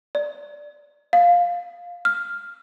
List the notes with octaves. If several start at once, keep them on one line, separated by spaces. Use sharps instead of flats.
D5
F5
F6